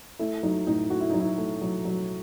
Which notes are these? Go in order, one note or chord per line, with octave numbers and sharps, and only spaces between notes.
A3 E4
F#3 D#4
A2 D#4
A2 F#4
E4
F#3 D#4
E4
A3
F#3
F#3